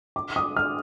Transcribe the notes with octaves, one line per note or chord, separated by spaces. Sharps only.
D6
D#6
F6